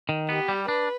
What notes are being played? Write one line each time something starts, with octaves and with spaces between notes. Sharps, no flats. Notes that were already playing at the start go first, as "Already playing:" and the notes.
D#3
B3 G4
G3
D4 B4